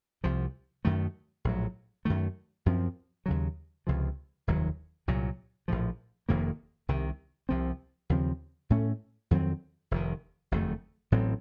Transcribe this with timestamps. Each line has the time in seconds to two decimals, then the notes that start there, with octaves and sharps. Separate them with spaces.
0.23 C2 C3 F3
0.85 F#2 D#3 A3
1.45 A#1 A2 F#3
2.05 F#2 D#3 A3
2.66 F#2 F3 C4
3.26 D#2 C#3 F#3
3.87 C#2 C3 F3
4.47 F1 D#2 D#3 F#3
5.08 C2 A#2 F#3
5.68 A#1 A2 F3
6.29 F1 F2 D#3 A#3
6.89 C2 C3 D#3
7.49 C2 C3 F3 C4
8.10 D#2 C#3 F3 C4
8.70 A2 A3 C#4
9.31 F2 D#3 F#3 C4
9.91 F1 F2 D#3
10.51 F#1 F2 D#3 A3
11.12 A1 A2 F#3 C4